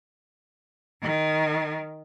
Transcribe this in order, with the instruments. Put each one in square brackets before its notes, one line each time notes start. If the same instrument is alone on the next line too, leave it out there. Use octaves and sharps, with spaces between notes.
[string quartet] D#3